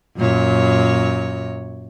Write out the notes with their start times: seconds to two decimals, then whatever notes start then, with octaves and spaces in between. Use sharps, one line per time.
0.17 F#2 A#2 C#5